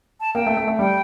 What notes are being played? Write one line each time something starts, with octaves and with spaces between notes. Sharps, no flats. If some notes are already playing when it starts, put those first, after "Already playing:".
A5
A#3 G5
A3
A3
A3
G3 G5